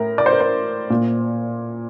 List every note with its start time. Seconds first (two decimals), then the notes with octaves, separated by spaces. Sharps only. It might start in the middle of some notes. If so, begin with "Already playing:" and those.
Already playing: A2 A#4
0.18 D5
0.26 C5
0.33 A#4
0.40 C5
0.90 A#2